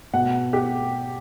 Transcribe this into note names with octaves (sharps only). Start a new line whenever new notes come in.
B2 F#5
G4